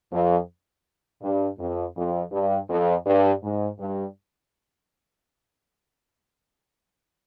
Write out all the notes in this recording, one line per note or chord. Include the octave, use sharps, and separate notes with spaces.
F2
G2
F2
F2
G2
F2
G2
G#2
G2